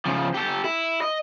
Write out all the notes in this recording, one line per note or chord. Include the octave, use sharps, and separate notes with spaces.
C#3 F3
G4 A4
E4
D#5